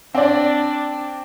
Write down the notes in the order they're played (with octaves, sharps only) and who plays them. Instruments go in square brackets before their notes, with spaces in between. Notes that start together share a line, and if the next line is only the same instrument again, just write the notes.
[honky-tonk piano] C4 D5 [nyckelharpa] D4